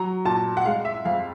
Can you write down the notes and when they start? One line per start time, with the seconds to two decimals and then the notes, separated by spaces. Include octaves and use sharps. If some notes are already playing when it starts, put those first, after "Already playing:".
Already playing: F#3 A#5
0.25 A#2 A5
0.57 F#5
0.66 G#3 F5
0.85 E5
1.05 F2 F5